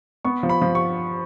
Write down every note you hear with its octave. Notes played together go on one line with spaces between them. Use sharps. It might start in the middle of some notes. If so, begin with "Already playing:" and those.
B3 C#6
F3
B5
F3
C#6